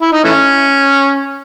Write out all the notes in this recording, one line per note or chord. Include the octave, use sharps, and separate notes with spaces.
E4
D#4
E3 A3 C#4